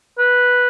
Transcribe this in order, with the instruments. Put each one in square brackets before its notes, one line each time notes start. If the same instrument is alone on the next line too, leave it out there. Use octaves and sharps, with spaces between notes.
[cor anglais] B4